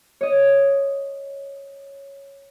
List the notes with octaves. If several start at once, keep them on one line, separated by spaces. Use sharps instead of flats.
C#5 D#5